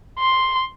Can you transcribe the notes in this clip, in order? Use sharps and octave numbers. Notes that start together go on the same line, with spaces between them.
C6